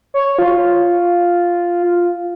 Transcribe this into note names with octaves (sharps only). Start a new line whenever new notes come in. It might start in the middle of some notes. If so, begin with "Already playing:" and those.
C#5
F4